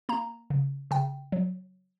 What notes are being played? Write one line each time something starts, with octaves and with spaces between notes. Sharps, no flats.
A#3 A#5
C#3
C#3 G5
F#3